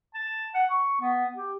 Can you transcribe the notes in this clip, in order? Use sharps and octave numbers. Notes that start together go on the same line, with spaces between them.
A5
F#5
C#6
B3
G4